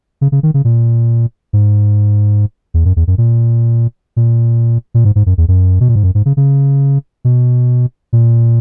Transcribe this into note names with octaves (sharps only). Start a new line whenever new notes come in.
C#3
C#3
D#3
C#3
A#2
G#2
E2
F#2
E2
F#2
A#2
A#2
A#2
G#2
G#2
F#2
E2
F#2
B2
A#2
G#2
F#2
G#2
C#3
C#3
B2
A#2